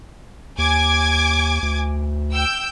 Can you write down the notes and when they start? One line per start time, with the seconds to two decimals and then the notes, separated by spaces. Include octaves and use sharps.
0.58 D#2 G#5 D6 G#6
1.63 D2
2.32 G5 E6 G6